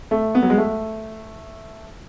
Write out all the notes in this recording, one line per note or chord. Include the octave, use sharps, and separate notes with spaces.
A3
B3
F#3
G#3
A3